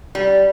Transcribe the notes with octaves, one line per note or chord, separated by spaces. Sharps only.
G3